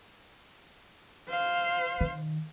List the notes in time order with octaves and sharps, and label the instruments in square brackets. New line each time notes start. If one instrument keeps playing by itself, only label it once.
[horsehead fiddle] C5 F5
[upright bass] D#3